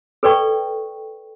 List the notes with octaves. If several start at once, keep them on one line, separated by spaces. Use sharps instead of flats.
A4 B4 D5 G5 C#6